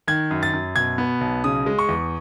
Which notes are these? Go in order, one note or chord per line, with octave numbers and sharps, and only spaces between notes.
D#3 G#6
F#2
A6
F#2
B2 G#6
B3
B1
C#3 D#6
G#3
C#6
E2